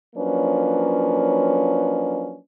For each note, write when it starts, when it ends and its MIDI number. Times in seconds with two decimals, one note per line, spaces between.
0.16 2.36 53
0.16 2.36 54
0.16 2.36 58
0.16 2.36 61
0.16 2.36 62
0.16 2.36 71